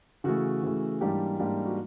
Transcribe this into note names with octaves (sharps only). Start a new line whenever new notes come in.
C#3 E3 A3 F#4
C#3 E3 A3
G#2 E3 G3 A#3 D4 G4
G#2 E3 G3 A#3 D4
F#4